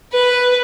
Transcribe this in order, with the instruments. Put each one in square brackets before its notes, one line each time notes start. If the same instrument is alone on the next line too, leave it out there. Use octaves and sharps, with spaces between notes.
[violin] B4